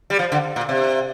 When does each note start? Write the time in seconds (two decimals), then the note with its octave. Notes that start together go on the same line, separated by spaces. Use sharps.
0.10 G3
0.19 F3
0.32 D3
0.56 A#2
0.69 C3